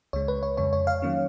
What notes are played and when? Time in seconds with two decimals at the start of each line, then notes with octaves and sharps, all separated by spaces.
0.13 C#2 C#3 G#3 C#5
0.28 B4
0.43 C#5
0.57 F2 C#3 G#3 C#5
0.73 C#5
0.87 C#5 F5
1.02 D#3 F#3 A#3 C#4